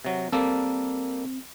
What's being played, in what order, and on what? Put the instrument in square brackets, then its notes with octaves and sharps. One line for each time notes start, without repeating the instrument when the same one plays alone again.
[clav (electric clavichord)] C3 F#3
[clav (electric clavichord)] G3 A#3 A4 [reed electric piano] C4